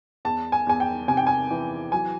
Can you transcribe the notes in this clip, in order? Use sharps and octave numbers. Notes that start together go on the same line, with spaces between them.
E2 A5
G#5
E2 G#5
G5
C3 G#5
G5
G#5
E3
F#3 G#5